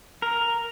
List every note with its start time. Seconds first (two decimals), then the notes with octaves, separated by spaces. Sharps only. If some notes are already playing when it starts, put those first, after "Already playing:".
0.22 A#4